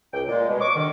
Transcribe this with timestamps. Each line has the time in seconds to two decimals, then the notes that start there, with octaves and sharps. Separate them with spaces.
0.14 C#2 G5
0.29 A#2 G#3
0.48 B2 G#3
0.60 D#5 C#6 D6
0.75 D3 D#3